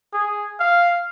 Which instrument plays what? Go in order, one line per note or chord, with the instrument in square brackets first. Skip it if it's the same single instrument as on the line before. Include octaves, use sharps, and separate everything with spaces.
[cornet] G#4
F5